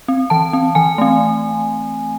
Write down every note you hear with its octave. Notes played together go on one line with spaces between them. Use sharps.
C4
E3 A5
C4
E3 G#5
A3 C4